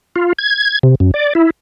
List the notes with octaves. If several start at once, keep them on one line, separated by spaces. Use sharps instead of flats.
F4
G#6
C3
F#2
D5
E4